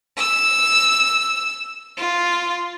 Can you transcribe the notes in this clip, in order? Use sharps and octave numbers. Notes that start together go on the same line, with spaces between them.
E6
F4